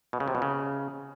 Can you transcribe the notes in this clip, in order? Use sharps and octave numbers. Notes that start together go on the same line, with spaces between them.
B2
C#3
C3
B2
C#3